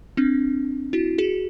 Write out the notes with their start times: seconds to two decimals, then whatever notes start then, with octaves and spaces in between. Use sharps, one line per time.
0.17 C4 D4
0.93 E4 F#4
1.18 F#4 G#4